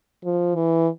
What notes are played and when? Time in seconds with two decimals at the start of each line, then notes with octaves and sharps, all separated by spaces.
0.24 F3
0.55 E3